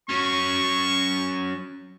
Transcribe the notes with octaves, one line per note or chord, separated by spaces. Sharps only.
F#3 C#4 C#6